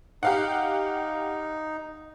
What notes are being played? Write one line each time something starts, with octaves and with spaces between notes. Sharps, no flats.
D#4 G4 F5 F#5